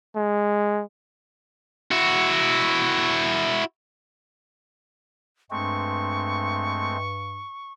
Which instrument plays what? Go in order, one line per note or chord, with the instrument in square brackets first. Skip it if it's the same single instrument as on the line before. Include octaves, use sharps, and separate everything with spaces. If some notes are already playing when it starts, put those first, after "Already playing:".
[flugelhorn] G#3
[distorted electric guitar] E4 F#4
[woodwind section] G2 [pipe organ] G#3 A3 C4 [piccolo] C#6